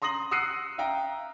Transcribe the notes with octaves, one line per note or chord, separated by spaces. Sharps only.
A#5 C6 D#6 A#6 F#7
D#6 E6 F#6 C7 C#7 D#7
E5 F5 G5 A#5